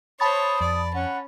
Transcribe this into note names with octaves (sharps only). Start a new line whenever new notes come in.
C5 C#5 A5 B5 D#6 A6
F2 D5
C#4 F#5